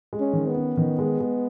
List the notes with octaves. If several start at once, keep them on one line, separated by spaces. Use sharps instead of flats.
G#3
C#4
D#3
B3
C#4
D#3
G#3
G#3